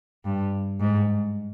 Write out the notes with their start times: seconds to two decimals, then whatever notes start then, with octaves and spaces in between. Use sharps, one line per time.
0.25 G2
0.80 G#2